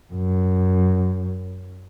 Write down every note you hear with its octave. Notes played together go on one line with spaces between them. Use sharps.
F#2